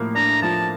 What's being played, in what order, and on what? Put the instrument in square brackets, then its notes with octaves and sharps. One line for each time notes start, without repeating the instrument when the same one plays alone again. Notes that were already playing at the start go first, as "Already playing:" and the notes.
Already playing: [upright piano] A2 F3 A#3
[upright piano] D4 [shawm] A#5
[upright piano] F3 [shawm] A5